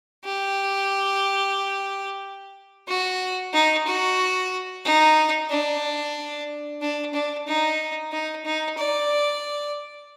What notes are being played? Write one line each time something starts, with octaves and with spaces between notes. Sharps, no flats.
G4
F#4
D#4
F#4
D#4
D4
D4
D4
D#4
D#4
D#4
D5